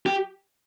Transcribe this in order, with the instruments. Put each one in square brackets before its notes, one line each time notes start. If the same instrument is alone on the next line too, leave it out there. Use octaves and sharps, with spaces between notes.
[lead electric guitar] G4